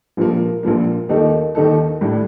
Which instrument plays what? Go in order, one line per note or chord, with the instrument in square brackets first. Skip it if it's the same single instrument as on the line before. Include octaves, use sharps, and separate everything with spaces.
[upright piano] A#1 A#2 F3 A#3
A#1 A#2 F3 A#3
D#2 D#3 A#3 D#4 A4
D#2 D#3 A#3 D#4 A4
A2 G3 D4